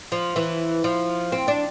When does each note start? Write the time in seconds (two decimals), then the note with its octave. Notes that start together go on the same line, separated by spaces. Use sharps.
0.12 F3
0.36 E3
0.84 F3
1.32 C4
1.48 D4